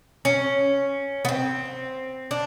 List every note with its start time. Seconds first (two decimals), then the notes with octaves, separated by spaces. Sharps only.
0.25 C#4
1.25 B3
1.28 C4
2.31 D4